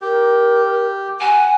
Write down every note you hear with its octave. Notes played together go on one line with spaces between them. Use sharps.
G4 A#4
F#5 G#5